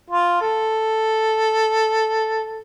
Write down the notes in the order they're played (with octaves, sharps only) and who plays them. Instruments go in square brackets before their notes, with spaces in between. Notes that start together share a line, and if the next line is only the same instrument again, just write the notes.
[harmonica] F4
A4